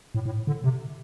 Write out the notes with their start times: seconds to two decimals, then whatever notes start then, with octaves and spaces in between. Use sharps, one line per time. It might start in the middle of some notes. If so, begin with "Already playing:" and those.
0.15 A2
0.26 A2
0.47 D3
0.64 C3